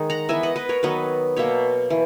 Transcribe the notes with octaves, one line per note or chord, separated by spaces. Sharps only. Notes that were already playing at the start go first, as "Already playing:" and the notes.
Already playing: D#3 G#3
F#5 A#5
E3 B3 E5 G#5
D#5 F#5
B4 D#5
A#4 C#5
D#3 F#3 B3 B4 D#5
B2 A#3 C#5 E5
E3